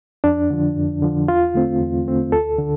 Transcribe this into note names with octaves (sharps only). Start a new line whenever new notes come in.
F2 D4
D3 F3
F2
D3 F3
E2 F4
D3 A3 C4
E2
D3 A3 C4
D2 A4
D3